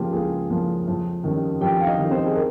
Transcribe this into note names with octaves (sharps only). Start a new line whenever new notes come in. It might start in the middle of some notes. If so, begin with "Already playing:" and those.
Already playing: C#3 F3 A#3 F4 G4
C#2 G#4
C#3 F3 A#3
F2
D#3 G3 C#4
F2 G4 G5
F5
D#4 D#5
D#3 G3 C#4
C4 C5
G#4
A#4